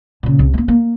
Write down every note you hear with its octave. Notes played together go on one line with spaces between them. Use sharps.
A#2 C#3
C2
A3 A#3
A#3